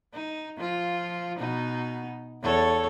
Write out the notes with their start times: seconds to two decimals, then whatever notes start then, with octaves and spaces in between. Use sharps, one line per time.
0.14 D#4
0.57 F3 F4
1.39 B2 B3 D#4
2.43 E2 A4 C#5